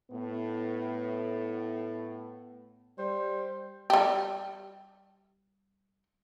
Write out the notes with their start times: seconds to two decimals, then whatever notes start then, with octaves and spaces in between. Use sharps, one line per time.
0.11 A2 B3
2.98 G3 C5
3.90 G3 G4